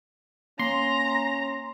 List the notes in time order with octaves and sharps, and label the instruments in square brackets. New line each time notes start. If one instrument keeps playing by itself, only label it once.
[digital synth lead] A#3 [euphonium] C#4 [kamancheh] A#5 [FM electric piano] C6